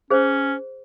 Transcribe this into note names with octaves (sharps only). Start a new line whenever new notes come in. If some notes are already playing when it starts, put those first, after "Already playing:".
C#4 G#4 C5